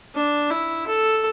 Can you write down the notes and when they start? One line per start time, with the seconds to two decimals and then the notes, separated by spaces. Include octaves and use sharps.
0.15 D4
0.51 E4
0.87 A4